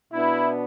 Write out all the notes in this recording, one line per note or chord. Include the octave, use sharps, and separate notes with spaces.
B2 B3 D4 E4